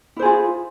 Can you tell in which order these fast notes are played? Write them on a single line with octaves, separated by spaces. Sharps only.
E4 C5 G#4 F4